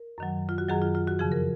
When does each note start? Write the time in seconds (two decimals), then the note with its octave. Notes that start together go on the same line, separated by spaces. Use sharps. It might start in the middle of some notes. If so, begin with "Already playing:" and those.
Already playing: A#4
0.18 F#2 D#3 F#3
0.49 F4
0.58 F#4
0.69 F#2 D#3 F#3 G#4
0.82 F4
0.95 F4
1.08 F#4
1.19 F2 C#3 F3 G#4
1.32 A#4